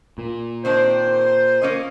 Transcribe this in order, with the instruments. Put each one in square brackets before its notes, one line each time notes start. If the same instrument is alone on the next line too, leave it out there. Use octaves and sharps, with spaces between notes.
[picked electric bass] A#2
[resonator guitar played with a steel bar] D#3 C4 D4 [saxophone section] C5
[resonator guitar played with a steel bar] A#3 C#4 D#5